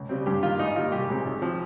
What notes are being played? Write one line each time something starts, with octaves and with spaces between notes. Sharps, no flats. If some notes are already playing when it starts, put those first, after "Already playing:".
Already playing: C#2
C#3 G3 C4
G2 G4
D#3 A#3 F4
G#2 D#4
D#3 G3 A#3 F4
C2 G4
A#2 G#3 C4
G#1
F3 C4